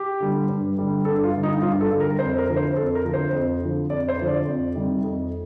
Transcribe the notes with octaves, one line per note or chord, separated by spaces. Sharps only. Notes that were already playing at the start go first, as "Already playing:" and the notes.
Already playing: G4
D3 G3
G2
D3 G3
G2 A4
F4
D3 G3
D#4
G2 F4
A4
D3 G3
A#4
F2 C5
A#4
D3 F3
C5
F2 A4
A#4
D3 F3
C5
F2
D3 F3
F2 D5
C5
D3 F3
D5
F2
C3 D#3 G3
F2